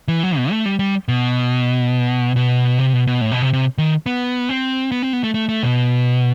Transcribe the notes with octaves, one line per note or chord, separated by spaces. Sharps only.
E3
F#3
B2
A3
G3
G3
B2
B2
C3
B2
B2
A2
B2
C3
C3
D#3
B3
C4
B3
C4
B3
A3
A3
A3
B2